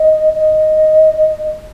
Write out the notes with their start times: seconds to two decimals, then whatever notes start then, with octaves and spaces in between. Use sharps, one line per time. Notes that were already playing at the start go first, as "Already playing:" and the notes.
Already playing: D#5
0.35 D#5